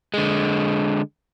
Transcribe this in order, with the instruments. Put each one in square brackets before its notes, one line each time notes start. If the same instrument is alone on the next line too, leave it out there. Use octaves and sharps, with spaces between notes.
[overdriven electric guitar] D3 G#3